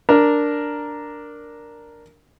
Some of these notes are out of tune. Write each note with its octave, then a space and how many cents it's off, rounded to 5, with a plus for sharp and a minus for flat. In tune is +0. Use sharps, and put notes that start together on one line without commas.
D4 +0 A#4 +0